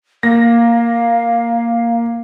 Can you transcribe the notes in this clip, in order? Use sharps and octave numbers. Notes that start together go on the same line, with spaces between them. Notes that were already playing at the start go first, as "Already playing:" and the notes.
A#3 F5 A#6